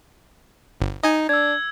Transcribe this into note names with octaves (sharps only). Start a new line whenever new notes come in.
G1
D#4 D#5 G#5
D4 E6 G#6